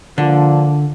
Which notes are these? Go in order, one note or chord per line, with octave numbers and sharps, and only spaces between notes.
D3 F3 A#3 D4 F4